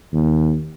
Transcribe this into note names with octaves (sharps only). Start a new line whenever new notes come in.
D#2